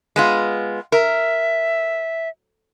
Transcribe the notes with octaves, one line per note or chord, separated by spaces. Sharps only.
G#3 B3 F4
A#4 E5